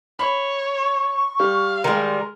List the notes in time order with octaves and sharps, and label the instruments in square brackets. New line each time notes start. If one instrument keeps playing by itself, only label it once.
[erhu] C#5 [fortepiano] B5
[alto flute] C#6
[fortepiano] G3 [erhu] F5
[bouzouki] D#3 G3 [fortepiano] G#3 A#4 [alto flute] C6